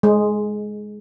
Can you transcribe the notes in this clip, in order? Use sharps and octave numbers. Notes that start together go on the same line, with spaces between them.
G#3